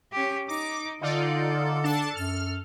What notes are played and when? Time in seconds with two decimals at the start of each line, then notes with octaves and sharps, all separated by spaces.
0.12 C#4 G4
0.48 D#4 D6
1.01 D3 D#4 F4 A4 D5
1.84 D4 A5
2.15 F#2 F6